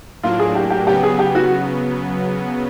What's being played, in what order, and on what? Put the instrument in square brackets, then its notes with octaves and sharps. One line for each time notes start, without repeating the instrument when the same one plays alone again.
[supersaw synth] A2 F#3 A#3 D4 [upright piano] F4
[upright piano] G#4
G4
G4
[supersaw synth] C#3 F#3 B3 [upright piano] G4
[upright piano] G#4
G4
F#4